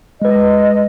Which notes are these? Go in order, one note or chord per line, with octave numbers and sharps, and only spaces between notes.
G#3 B4 D#5